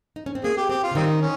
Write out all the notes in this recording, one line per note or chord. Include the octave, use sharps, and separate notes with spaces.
D#4
C#4
C4
A#3 G#4
G4
C4 G4
F4
C#3
D#3 G3 C4 D#4
C#4